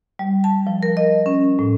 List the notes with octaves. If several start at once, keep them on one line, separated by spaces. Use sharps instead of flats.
G3
A5
F3
A#4
D#5
C#4
A2